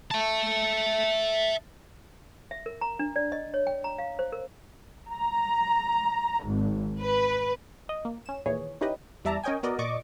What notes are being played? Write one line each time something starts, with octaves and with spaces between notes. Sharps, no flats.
E5 A5
E5
A#4
A#5
D4
D5
D#5
C#5
G5
A#5
F5
C5
A#4
A#5
G#1
B4
D#5
A#3
C#4 E7
D#2 A#2 E3 G#4 C#5
C#4 D#4 E4 G4 B4 D#5
E2 G3 D5 E5 A5 A#5
C#4 A#4 C#5 D#5 G5 G#5
B3 F#4 A#4 D5 D#5
A#2 D5 D#5 C#6 D6